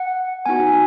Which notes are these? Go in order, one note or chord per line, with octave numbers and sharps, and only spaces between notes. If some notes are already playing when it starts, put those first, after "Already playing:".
Already playing: F#5
B3 D#4 F#4 G#5